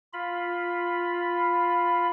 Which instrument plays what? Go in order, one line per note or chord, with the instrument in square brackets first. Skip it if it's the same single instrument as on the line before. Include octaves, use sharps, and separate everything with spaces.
[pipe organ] F4 B5